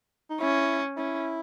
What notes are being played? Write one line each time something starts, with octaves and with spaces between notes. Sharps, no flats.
D#4
C#4 E4
C#4 E4